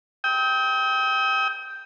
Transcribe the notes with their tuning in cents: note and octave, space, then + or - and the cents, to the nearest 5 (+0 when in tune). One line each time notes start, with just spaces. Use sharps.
G5 +0 D#6 +45